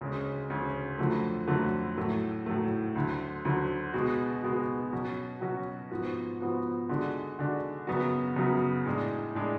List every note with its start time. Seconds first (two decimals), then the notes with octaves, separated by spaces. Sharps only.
0.01 D2 C#3 G#3 C#4
0.49 D2 C#3 G#3 C#4
0.99 F2 D3 F#3 A3
1.47 F2 D3 F#3 A3
1.97 A2 F#3 A3
2.46 A2 F#3 A3
2.95 D2 D3 F#3
3.45 D2 D3 F#3
3.93 B2 G#3 B3 F#4
4.44 B2 G#3 B3 F#4
4.93 B2 F#3 C#4 F#4
5.41 B2 F#3 C#4 F#4
5.91 G#2 F3 B3 F#4
6.41 G#2 F3 B3 F#4
6.89 D3 G#3 D4 F#4
7.39 D3 G#3 D4 F#4
7.87 F#2 C#3 F#3 B3 F#4
8.36 F#2 C#3 F#3 B3 F#4
8.86 A2 G#3 D4
9.35 A2 G#3 D4